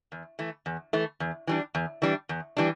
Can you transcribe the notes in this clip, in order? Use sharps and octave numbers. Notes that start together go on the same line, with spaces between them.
E2
E3 A3
E2
E3 A3
E2
E3 G3 D4
E2
E3 G3 D4
E2
E3 G3 D4